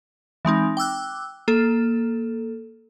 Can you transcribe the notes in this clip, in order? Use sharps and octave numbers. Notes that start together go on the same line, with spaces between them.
E3 G#3 C4 D#4
G5 D6 E6 F#6
A#3 A4